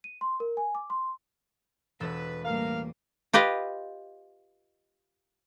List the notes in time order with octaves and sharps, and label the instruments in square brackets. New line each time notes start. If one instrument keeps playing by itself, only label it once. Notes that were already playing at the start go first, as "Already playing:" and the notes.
[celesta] D#7
C6
A#4
G#5
D6
C6
[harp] E1 A4 E7 [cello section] B4
[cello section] A2 G3 A#3 [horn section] A#4 F5
[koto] F4 G4 B4 D#5 F5